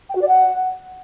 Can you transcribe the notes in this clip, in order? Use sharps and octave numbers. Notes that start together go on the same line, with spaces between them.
G5
F#4
D5
F#5